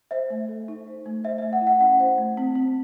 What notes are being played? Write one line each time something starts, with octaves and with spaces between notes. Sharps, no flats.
C5 E5
A3
A4
D#4
C5
A3
C5 E5
A3 E5
F#5
E4
F#5
C#4 F#5
C5
A3
C4
C4